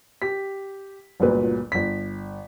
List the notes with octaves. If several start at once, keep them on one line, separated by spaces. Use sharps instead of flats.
G4 B6
G1 C#2 A#2 F#3 B4
G1 B6